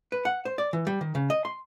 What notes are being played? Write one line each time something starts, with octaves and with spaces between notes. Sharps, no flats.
B4
F#5
C5
D5
E3
G3
D#3
C#3
D#5
C6